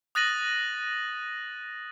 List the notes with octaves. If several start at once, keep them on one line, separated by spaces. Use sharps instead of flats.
D#6 F#6 A6 A#6 D#7 F#7